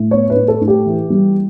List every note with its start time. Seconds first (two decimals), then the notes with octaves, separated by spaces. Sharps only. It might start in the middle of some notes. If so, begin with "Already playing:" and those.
Already playing: A2
0.11 B3 C#5
0.30 B4
0.36 A2
0.48 A4
0.61 A2
0.68 G4
0.86 E3
1.10 G3